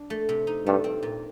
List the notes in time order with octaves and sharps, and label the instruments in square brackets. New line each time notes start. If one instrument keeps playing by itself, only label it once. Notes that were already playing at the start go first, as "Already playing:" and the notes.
Already playing: [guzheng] D4
A3
C3
D#4
[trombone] G2 [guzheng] A3
[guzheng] C4
A#2